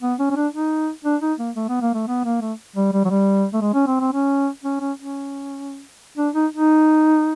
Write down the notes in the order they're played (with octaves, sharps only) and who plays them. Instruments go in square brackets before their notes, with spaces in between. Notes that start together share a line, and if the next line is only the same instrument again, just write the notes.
[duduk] B3
C#4
C#4
D4
D#4
D4
D#4
A#3
A3
B3
A#3
A3
B3
A#3
A3
G3
G3
F#3
G3
A3
G#3
C#4
C4
C4
C#4
C#4
C#4
C#4
D4
D#4
D#4